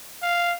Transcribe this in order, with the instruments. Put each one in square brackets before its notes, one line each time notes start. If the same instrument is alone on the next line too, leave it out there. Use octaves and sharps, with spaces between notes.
[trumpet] F5